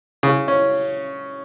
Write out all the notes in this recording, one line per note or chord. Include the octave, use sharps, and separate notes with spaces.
C#3
C#4